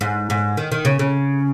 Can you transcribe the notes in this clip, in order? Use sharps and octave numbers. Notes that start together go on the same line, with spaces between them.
G#2
G#2
D#3
D#3
C#3
C#3